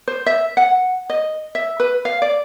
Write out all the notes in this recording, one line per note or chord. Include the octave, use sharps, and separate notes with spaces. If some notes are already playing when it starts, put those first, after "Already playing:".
C5
E5
F#5
D#5
E5
B4
F5
D5